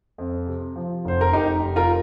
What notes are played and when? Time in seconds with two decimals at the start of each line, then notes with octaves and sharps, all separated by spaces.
0.18 F2
0.47 C3
0.76 F3
1.05 F1 C5
1.21 A#4
1.33 F1 D#4 G4
1.62 F1
1.76 F4 A#4